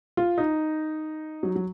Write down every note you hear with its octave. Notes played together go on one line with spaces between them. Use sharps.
F4
D#4
F#3
F#3